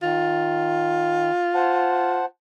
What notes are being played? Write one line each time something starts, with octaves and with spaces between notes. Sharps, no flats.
D#3 F4
C5 F#5 A5